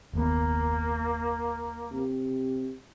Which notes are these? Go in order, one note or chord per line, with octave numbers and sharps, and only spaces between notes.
F#1 D#2 A#3 B3
C3